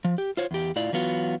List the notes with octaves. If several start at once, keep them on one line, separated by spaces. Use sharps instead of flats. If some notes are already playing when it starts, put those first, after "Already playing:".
F3
G4
F4 C5 C#5
E2 G4
A2 E4 F4 D5
E3 F#3 B3 F4 F#4